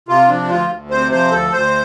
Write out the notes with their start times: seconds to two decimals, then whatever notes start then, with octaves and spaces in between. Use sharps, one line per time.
0.08 C3 F4
0.29 F3 D4
0.49 D2 F4
0.70 D2
0.90 C3 C5
1.11 F3 C5
1.32 D2 A4
1.53 D2 C5